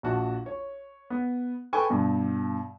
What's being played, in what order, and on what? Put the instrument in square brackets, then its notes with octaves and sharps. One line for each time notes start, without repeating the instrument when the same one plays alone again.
[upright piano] A#1 F#4 A5
C#5
B3
A4 B4 G5 G#5 C#6
G2 B2